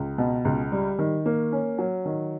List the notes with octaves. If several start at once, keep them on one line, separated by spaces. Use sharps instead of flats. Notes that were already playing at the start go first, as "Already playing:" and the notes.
Already playing: C#2
B2
C#2
G3
D#3
A#3
C#4
F#3
D#3